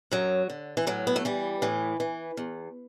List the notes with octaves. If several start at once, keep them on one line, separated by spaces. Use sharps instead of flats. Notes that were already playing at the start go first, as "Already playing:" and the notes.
F#2 F#3
D3
E3
A2 F#3
B3
A3
E3 G3
A2 E3
E3
E2